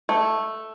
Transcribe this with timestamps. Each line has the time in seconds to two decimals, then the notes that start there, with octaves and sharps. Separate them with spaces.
0.09 A3